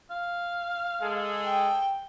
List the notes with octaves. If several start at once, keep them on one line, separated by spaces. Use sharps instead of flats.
F5
G#3 G#4 A4
G5